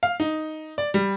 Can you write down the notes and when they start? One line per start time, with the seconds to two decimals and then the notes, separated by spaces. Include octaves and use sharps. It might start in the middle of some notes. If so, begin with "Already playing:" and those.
0.03 F5
0.20 D#4
0.78 D5
0.94 G3